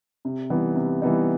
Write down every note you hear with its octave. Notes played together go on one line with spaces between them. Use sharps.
C3
E3 G3 B3 D#4
C3
E3 G3 B3 D#4